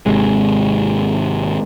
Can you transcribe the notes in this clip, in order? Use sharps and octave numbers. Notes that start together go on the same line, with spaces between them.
G#1 C3 G#3